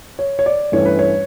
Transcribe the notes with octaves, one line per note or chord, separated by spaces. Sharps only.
C#5
C#5
D5
G2 E3 A3 C#4 C#5
B4
C#5